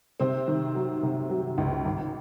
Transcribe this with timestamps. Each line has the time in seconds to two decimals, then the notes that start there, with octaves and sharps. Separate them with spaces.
0.20 C3 C4 C5
0.48 D#3
0.75 F#3
1.03 C3
1.30 F#3
1.58 C#2
1.85 G#1